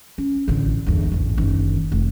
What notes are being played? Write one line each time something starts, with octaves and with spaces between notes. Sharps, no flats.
C#4
A1 D3
G1 E2
A1 E2
F#1 D#3
F1